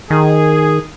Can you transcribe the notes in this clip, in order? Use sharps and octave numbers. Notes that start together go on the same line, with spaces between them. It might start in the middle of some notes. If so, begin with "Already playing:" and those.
D#3 G#4